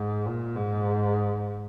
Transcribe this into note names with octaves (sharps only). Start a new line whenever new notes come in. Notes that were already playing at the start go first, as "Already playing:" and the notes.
Already playing: G#2
A#2
G#2